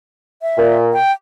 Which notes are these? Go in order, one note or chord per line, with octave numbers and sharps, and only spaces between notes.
E5
A#2
G5